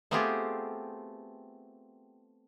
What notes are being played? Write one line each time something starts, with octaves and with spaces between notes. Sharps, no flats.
A3 B3 C4 F4 G4 G#4